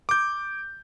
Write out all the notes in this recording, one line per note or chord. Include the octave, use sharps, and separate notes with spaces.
D6 G6